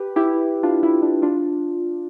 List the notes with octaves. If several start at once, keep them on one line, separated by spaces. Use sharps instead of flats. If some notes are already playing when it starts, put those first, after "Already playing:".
Already playing: G4 B4
E4 G4
D4 F4
E4
D4
D4 F4